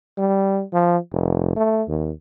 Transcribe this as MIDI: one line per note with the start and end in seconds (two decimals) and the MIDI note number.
0.18 0.63 55
0.73 0.97 53
1.13 1.52 29
1.56 1.83 57
1.88 2.11 39